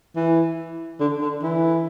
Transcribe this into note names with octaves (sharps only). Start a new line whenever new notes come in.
E3
D3
D3
E3